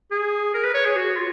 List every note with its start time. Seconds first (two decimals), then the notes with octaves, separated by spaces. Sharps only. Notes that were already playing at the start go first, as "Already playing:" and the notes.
0.11 G#4
0.54 A#4
0.64 B4
0.74 C#5
0.85 G#4
0.96 F#4
1.16 F4